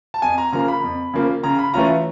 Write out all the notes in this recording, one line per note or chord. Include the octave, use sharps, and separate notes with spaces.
A5
F2 G#5
A#5
C#3 F3 A#3 A#5
B5
F2
C#3 F3 A#3
C#3 A#5
B5
E3 A3 C#4 F4 A#5